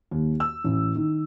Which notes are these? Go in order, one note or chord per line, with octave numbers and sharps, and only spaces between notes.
D#2
E6
A1
D#3